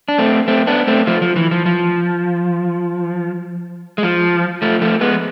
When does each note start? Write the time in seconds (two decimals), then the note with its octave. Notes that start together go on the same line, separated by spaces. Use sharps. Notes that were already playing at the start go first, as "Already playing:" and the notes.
0.08 D4
0.18 A3 C4
0.48 A3 C4
0.67 B3 D4
0.87 A3 C4
1.07 F3 A3
1.22 F3
1.36 E3
1.51 F3
1.66 F3
3.98 G#3
4.03 F3
4.62 F3 A3
4.81 F3 A3
5.01 G#3 B3